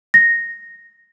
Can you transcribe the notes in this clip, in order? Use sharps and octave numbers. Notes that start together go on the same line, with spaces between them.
A#6